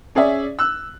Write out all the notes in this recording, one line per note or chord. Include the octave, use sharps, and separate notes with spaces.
C#4 G#4 D5 E5
E6 F#6